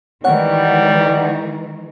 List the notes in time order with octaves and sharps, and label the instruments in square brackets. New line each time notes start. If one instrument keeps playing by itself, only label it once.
[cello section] D#3 E3 G#3 [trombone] G3 [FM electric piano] C#5 F#5